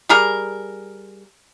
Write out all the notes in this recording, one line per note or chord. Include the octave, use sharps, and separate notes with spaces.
G3 G#4 A#4